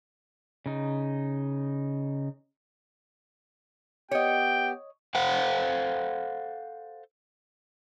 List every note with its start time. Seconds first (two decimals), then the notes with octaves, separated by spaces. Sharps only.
0.66 C#3 D#4
4.11 B3 G4 C#5 D#5 G5
5.15 A4 C5 F5 F#5